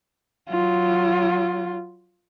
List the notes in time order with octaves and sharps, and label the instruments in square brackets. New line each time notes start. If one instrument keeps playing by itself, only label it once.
[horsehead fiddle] F#3 F4